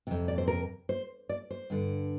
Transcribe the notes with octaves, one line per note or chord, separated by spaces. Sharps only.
F2 C3
D5
C5
A#4
C5
D5
C5
G2 D3